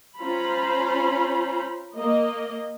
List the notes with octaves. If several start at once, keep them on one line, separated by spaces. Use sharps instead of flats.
C#4 F4 C5 A#5 B5
A#3 D#5